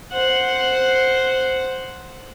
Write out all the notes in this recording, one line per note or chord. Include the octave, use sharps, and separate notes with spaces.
C5 F#5